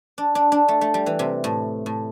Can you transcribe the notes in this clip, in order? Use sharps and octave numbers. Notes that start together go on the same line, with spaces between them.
D4
D4
D4
A3
A3
G3
E3
C3
A2
A2